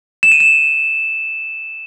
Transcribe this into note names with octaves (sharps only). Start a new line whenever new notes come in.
E7
D#7
E7